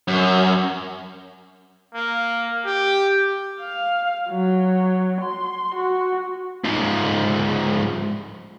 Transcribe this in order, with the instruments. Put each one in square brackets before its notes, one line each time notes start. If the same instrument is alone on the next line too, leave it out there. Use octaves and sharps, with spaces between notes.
[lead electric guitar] F#2
[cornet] A#3
G4
[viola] F5
F#3
C6
F#4
[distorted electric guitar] G#2 F3